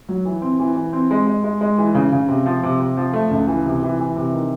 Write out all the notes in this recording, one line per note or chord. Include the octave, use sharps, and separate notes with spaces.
F#3
E3
C4
E3
E3
C4
G#3
G#3
G#3
G#3
E3
C#3
C#3
C3
F3
C3
C3
F3
A3
C#2
E3
C3
E3
E3
C3
D#3